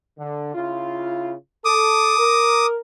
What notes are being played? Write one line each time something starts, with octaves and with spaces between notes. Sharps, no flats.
D3
C#3 E4 F4
A4 D6 D#6
A#4